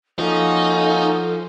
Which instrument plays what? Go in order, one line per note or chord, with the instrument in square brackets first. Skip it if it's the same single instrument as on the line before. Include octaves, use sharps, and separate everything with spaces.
[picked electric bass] F3 [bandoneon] A#3 C#4 F#4 [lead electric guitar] D#4 [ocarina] A4